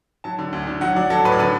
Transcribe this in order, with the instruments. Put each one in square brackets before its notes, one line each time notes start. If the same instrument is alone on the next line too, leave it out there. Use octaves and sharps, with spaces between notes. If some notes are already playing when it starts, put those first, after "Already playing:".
[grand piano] F#3 A5
D3
D2
D3
F#3 F#5
F#3 D5
F#3 A4
A2 B4
D5
D3 B4